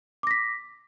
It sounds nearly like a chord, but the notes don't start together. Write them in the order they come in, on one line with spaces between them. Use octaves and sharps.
D6 A#6 B6